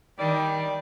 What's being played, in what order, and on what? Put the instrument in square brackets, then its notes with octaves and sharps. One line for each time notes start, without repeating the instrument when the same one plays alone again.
[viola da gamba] D#3 [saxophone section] G3 D5 [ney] G5